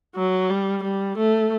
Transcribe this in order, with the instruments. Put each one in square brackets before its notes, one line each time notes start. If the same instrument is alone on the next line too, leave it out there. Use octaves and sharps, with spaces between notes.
[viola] F#3
G3
G3
A3